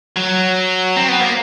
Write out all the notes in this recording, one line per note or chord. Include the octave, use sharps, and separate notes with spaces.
F#3
C4
B3
A#3